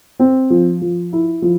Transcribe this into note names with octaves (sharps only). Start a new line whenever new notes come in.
C4
F3
F3
E4
F3